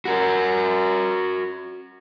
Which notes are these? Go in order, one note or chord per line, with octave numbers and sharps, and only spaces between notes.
F#4 A#4